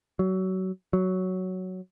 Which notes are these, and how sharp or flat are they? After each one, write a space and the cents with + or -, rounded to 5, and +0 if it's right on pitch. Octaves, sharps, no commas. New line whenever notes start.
F#3 +25
F#3 +5